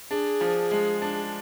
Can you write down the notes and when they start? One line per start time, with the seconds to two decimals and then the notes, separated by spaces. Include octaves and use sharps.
0.10 D4 G#4
0.41 F3
0.71 G#3
1.02 D4